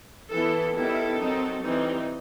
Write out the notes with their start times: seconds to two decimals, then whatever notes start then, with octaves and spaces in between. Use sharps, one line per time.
0.31 E3 B3 E4 A4
0.75 D#3 G3 B3 E4 A4
1.19 F#3 C4 D#4
1.63 E3 G3 C4 D#4